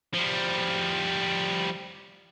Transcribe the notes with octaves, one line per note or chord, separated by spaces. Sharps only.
F3 G3